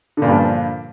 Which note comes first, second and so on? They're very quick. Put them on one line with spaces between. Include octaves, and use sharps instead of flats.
D3 A#2 G2 F3